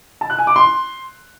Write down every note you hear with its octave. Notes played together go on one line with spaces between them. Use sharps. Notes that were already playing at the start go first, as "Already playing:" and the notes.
A5
F#6
G#5
D6
C6